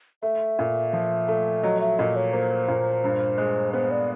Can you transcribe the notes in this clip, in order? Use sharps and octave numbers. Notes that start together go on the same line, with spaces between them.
A3 E5
A#2
F3
A3
F#3 D#5
E5
A#2 D#5
C#5
A#3 C5
A#2
G2
G#3
B3 C5
D5